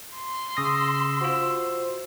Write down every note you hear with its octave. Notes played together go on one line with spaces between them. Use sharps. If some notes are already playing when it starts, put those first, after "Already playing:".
C6
C#3 D#6 E6 A#6
F4 F#4 C5